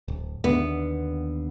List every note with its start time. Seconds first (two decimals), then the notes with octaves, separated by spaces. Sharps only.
0.08 D1
0.44 D#2 D3 B3